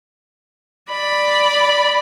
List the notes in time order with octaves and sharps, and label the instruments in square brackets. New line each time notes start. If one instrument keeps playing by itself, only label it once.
[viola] D5 B5